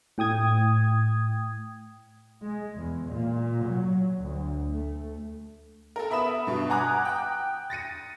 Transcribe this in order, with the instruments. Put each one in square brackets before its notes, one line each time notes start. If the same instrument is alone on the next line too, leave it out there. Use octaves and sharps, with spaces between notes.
[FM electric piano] A2 G5 D#6 G#6
[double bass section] G#3
E2
A#2
F#3
D2
A3
[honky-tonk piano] A4 A#4
B3 E5 B5 D#6 E7
G2 B2
F#5 G#5 A#5 D6 D#6 F#6
G5 F#6
A6 A#6 C#7 D#7